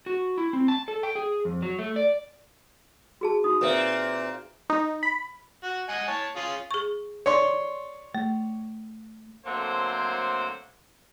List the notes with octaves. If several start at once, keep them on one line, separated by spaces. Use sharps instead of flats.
F#4
E4
C4
A5
A4
G5
G#4
F2
F#3
A3
D5
F#4 G#4 A5
D#4 F#4 D#6
A#2 C4 B4 E5
D#4
B5
F#4
D#5 F#5 G#5
C#5 A5
C#4 F4 G#4
G#4 C#6
C#5 D5 C6
A3
D3 F#3 A3 A#3 C4 C5